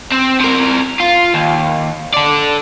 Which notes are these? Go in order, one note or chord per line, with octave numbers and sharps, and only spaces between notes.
C4
C3 A#4
F4
D#2
A4 D5